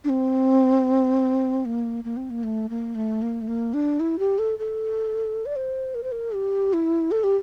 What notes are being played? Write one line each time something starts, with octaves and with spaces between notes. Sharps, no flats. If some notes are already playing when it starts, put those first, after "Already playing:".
D4
C4
A#3
A#3
C4
A#3
A3
A#3
A3
A#3
A3
A#3
D4
E4
G4
A4
A4
D5
C5
A#4
C5
A#4
G4
E4
A4
G4